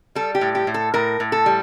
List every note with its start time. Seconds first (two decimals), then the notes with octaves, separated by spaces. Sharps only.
0.15 G3 A4
0.35 G4
0.41 A2
0.55 G4
0.67 A2
0.74 A4
0.94 A2 A#4
1.20 A2
1.32 A4
1.46 G3